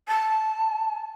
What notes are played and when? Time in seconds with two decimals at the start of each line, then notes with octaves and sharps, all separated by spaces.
0.08 A5